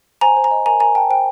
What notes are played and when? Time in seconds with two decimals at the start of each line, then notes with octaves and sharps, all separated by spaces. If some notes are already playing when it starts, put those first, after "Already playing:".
0.21 C5 G#5 A#5
0.37 C5
0.44 G#5 A#5
0.51 D#5
0.66 A#4 G#5 A#5
0.80 A#4 G#5 A#5
0.95 A#4 G5 A5
1.09 C5 G5